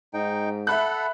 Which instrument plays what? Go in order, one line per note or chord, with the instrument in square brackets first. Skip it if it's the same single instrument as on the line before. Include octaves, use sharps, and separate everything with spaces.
[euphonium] G#2 [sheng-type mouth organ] D#4 G5
[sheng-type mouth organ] A4 F#5 [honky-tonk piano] E5 B5 F#6